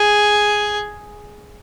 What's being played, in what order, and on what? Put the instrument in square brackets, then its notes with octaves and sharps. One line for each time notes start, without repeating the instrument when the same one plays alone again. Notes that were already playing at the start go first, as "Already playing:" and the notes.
Already playing: [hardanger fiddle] G#4